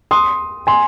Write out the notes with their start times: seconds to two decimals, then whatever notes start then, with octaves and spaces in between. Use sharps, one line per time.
0.11 C6 D#6
0.67 G#5 C6